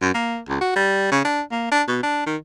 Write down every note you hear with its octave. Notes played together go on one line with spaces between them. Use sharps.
F#2
A#3
C#2
F#4
G3
C#3
D4
A#3
D4
B2
D4
D#3